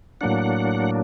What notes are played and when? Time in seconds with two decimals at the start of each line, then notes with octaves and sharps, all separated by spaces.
0.21 A2 F#3 A#3 D4 F#5